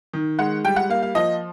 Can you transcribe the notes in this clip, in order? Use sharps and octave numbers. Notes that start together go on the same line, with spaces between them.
D#3
G#3 F#5
G3 G5
F#5
A#3 F5
F5
F3 D#5